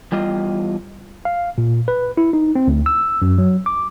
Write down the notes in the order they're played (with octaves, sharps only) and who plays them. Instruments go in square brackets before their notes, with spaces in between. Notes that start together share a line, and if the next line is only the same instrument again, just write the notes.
[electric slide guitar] E2 G3 F4 D#5
[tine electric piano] F5
A#2
B4
E4
D#4
C4
D2
E6
F#2
F#3
D6